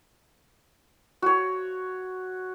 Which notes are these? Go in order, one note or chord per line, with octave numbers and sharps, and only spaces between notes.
F#4 C#5